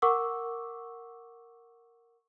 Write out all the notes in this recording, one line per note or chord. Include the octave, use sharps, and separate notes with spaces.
A#4 F#5 C#6 D6 E6